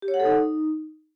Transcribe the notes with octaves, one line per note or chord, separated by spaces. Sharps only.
G4
C#5
F#5
A4
D#4